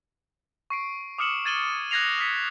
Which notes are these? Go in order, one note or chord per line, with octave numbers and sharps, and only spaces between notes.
C#6 C7 D7
D6 D#6 F6 C#7 E7 F#7
G#6 A6 D#7 F#7 G7
F#6 G#6 A#6 C7 F7
D#6 F6 A#6 B6 C#7 D#7